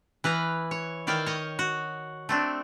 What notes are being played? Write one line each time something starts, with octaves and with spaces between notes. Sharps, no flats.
E3 B4 F5 A#5
C#5
D#3 E4 D5 F5 G5
C#5 D#5
F#4
A3 C4 D4